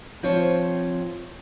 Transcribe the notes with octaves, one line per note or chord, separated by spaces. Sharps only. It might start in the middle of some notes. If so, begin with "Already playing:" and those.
F3 C4 F4 C5 C#5